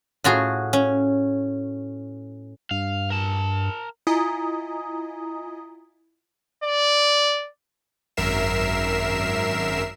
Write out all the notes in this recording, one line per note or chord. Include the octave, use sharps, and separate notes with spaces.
A2 F4 F#4 G#4
C#4
G2 F5
A#4 A5
E4 F4 D#5 G#5 A#5 D#6
D5
G#1 F#2 A#4 E5 C7 E7